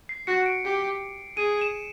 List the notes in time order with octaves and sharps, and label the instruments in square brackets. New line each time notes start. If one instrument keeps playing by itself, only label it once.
[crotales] C7
[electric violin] F#4 [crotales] C#7
[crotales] D7
[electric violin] G4
[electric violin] G#4 [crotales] D#7
[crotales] E7